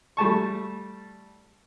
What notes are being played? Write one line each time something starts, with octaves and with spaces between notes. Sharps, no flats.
G3 A3 A5 C#6